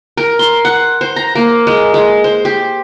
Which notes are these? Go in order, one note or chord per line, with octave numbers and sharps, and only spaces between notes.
A#4
C6
F#5
C5
A#5
A#3
G#3
G#3
C5
G4